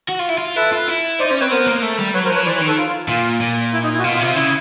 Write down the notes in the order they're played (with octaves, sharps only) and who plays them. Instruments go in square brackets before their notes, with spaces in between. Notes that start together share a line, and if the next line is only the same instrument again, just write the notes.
[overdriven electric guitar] F#4
F4
E4
F4
[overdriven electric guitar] E4 [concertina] A4 B4
[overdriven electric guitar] F4
E4
[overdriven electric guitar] D#4 [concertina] C5 D5
[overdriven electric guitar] C#4 [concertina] C5 D5
[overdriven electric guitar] C4 [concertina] B4 C#5
[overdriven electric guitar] B3 [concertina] A#4 C5
[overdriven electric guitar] A#3
A3
G3
[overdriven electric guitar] F#3 [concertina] B4 C#5
[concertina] A#4 C5
[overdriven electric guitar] F3
[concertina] B4 C#5
[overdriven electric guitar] E3 [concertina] C5 D5
[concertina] B4 C#5
[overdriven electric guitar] D#3
[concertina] A4 B4
F4
F4
[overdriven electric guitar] A#2 [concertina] F4
[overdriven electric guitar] A#2
[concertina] E4
D#4
E4
F#4
[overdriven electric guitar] B2 [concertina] F4
[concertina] F4
[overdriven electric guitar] C3
[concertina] F4
[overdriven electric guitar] C#3 [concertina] E4